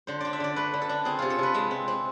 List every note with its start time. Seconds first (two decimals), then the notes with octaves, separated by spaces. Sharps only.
0.07 D3 C5
0.20 D4 D5
0.33 E5
0.40 D3 D5
0.56 A3 B4
0.73 D3
0.81 A4
0.89 D4
1.05 C4 G#4
1.19 C3 F4
1.30 A4
1.39 C3 B4
1.54 G#3 E5
1.71 C4
1.88 C4